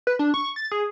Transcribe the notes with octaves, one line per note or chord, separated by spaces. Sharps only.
B4
D4
C#6
A6
G#4